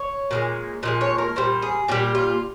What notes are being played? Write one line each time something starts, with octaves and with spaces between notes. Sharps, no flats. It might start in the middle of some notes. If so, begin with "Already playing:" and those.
Already playing: C#5
A#2 F3 G#3
A#2 F3 G#3 D#5
C#5
A#4
A#2 G3 C5
G#4
A#2 G3 G4
F4